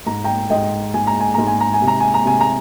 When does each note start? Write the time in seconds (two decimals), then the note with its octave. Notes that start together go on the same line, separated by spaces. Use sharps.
0.06 G#2 A#5
0.24 G5 A#5
0.50 G#2 D#5 G5
0.94 G#2 G#5
1.07 A#5
1.20 G#5
1.34 G#2 A#5
1.47 G#5
1.60 A#5
1.74 G#5
1.82 C3
1.87 A#5
2.00 G#5
2.14 A#5
2.25 C3 G#5
2.40 A#5